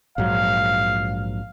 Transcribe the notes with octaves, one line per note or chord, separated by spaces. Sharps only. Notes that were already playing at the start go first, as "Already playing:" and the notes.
A#1 G#2 F#3 F5